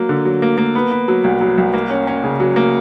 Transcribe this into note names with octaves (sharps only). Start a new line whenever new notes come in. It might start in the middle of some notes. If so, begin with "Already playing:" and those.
Already playing: F#3 A#3
D3
F#3
A#3
A#3
B3
B3
F#3
C2
F#3
C2
A#3
C#4
C#4
C#3
F#3
A#3